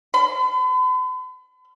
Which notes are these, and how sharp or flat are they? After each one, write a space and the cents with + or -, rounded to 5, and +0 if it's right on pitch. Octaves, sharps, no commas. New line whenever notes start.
B5 +45